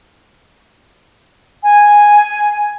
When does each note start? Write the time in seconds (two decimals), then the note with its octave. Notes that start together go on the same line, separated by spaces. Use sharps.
1.63 G#5